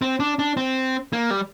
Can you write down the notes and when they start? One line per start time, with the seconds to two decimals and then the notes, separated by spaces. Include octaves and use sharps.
0.02 C4
0.20 D4
0.39 D4
0.57 C4
1.13 A#3
1.31 G3